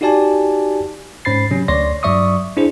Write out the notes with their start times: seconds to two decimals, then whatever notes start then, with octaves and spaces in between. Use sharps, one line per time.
0.01 D#4 F#4 G4 D5 G#5 A5
1.25 G#2 C#4 C5 B5 A6 C7
1.51 C3 F#3 C#4
1.68 D2 C#5 D5 C6 A#6
2.03 G2 F#3 D5 E5 C#6 D#6
2.57 D4 E4 G#4 C5